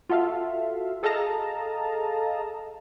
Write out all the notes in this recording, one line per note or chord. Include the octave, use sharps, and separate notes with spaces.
F4 F#4 A4 E5 F5
G#4 A4 D#5 F5 A5 A#5